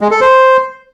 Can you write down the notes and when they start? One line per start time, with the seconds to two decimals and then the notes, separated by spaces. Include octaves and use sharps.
0.01 G#3
0.11 A4
0.21 C5